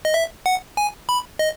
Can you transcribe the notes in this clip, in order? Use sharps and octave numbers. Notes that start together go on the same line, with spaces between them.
D#5
E5
F#5
G#5
B5
D#5